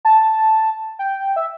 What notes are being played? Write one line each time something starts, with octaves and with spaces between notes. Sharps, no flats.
A5
G5
E5